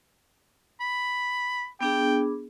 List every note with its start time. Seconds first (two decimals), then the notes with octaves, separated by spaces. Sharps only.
0.80 B5
1.81 B3 D4 G#4 G5